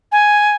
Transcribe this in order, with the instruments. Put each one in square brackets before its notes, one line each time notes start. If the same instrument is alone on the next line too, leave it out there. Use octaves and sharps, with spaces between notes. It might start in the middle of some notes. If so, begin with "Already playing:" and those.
[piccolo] G#5